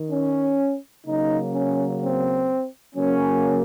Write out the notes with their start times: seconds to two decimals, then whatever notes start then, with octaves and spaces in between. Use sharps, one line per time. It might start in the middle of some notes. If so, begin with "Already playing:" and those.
Already playing: D#3
0.11 C#4
1.05 C#3 F#3 A#3 D#4
1.52 C#4
2.00 C4
2.94 C#3 F#3 A#3 C#4